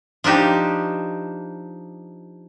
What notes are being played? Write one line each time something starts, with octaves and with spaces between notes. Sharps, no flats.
F3 D4 D#4 G4